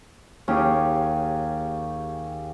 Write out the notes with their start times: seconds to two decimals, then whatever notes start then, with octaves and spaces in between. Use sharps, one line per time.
0.48 D#2 C#4 G4 G#4